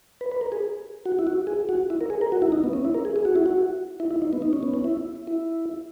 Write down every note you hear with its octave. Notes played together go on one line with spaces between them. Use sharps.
B4
B4
A#4
G#4
F#4
E4
F#4
G#4
F#4
E4
A#4
G#4
A#4
F#4
E4
D#4
B3
C#4
E4
A#4
G#4
G#4
F#4
E4
F#4
E4
E4
D#4
B3
D#4
C#4
B3
C#4
E4
E4